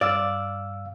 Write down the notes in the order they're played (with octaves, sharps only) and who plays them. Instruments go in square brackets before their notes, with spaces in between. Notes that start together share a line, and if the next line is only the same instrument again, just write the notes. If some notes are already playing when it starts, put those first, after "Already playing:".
[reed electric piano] G2 F5 E6 [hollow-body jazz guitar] D5